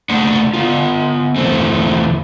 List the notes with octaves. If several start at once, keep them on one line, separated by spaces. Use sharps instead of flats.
A3 D4 D#4 F#5
B3 F4
E2 D3 A3 C4